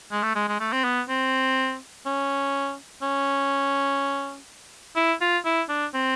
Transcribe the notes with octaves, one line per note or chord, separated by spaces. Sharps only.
G#3
A3
G#3
G#3
A3
C4
B3
C4
C#4
C#4
E4
F4
E4
D4
C4